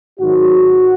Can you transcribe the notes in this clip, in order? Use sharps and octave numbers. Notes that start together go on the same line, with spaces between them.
G#2 D#3 F#3 F#4